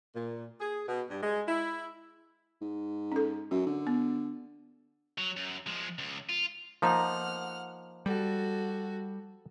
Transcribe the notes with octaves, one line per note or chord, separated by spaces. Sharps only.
A#2
G#4
B2
G2
G#3
E4
G#2
C#4 A4
F#2 F#4
D3
B3
F#3
F#2
F3 G#3
C#2
F4
F3 A#3 D#4 F#5 F6
G3 F#4 A4